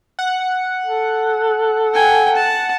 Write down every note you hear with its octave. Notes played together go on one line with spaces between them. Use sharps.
F#5
A4
G5 G#5
A5